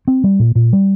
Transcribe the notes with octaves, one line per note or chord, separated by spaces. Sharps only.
C4
G3
A#2
A#2
G3